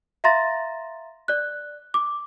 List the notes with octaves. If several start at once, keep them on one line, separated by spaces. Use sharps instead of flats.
E5 F5 A#5 C6 A6 A#6
D5 F#6
D6